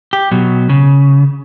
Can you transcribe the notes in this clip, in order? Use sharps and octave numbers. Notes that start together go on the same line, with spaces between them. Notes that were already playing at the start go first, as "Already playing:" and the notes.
G4
B2 F#3
C#3